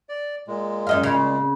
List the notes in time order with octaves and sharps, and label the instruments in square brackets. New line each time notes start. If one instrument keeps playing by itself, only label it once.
[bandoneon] D5
A#2 G#3
[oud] F#2 D#5 F5
C#3